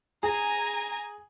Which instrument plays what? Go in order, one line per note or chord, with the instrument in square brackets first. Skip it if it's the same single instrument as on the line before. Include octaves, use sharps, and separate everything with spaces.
[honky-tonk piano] G#4 [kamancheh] G#5 A#5